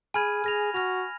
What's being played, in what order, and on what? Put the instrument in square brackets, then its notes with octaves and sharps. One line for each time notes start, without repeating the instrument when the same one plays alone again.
[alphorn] G#4 [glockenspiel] G#5 B5 F6 G#6 D#7
[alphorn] G#4 [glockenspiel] F6 A#6 F7
[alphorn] F#4 [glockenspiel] F6 A#6 F7